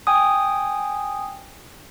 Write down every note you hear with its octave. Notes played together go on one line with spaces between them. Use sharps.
G5 G#5 D#6